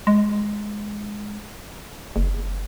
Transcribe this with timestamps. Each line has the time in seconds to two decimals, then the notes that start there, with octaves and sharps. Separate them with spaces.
0.07 G#3
2.16 F#1